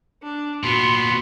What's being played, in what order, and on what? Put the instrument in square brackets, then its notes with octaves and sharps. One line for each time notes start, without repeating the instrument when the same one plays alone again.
[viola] D4
[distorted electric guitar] A#2 B3 [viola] F#4 C6